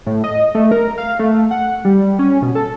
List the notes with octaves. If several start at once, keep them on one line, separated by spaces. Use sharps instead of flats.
A2
D#5
A3
A#4
F5
A3
F#5
G3
C#4
B2
A4